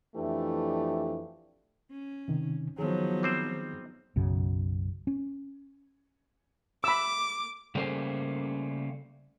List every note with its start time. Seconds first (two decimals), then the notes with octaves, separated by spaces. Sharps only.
0.16 F2 E3 A3 D4 G4
1.91 C#4
2.28 C3 D#3
2.78 D#3 F3 F#3 B3 D#4 G#4
3.23 G3 C4 C5
4.16 B1 F#2 C#3
5.07 C#4
6.84 B5 D6 E6
7.75 C#3 G3 A3 A#3 C#4 C5